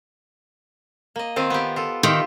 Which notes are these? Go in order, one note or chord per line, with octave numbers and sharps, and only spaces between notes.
A#3 D#5
D#3 C4 F4
B3 G4
F4 A4
D#3 F4 G4 E5